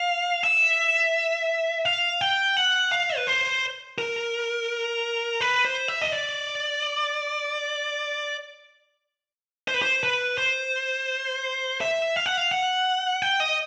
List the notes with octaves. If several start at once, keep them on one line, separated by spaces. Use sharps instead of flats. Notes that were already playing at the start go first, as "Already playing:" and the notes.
Already playing: F5
E5
F5
G5
F#5
F5
B4
C5
A#4
B4
C5
E5
D#5
D5
C5
B4
C5
B4
C5
E5
F5
F#5
F5
F#5
G5
D#5